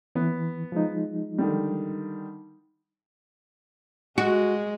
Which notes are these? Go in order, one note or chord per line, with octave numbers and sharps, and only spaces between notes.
E3 B3
F3 G#3 D#4
D3 D#3 G3
G#3 F#4